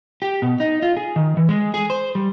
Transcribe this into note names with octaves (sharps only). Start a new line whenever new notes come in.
G4
B2
D#4
F4
G#4
D#3
E3
G#3
G#4
C5
G3